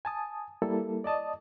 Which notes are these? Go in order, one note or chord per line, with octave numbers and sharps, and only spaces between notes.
G#5 A5 D#6
G3 A#3 E4 A4
D5 D#5 A5 D#6